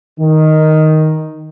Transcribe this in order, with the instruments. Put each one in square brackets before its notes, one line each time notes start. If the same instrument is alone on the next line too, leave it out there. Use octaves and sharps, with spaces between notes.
[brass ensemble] D#3